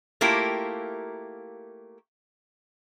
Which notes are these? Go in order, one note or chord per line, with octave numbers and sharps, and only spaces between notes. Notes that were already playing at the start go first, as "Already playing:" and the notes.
A3 A#3 E4 F4 G4 A#4